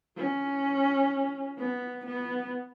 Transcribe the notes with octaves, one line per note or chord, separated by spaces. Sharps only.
C#4
B3
B3